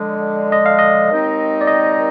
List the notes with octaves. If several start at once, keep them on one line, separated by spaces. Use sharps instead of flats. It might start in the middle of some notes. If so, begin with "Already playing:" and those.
Already playing: D3 F3 G#3 D#5
D#5
F5
D#5
D#2 D#3 G#3 C4 D#4
D5
D#5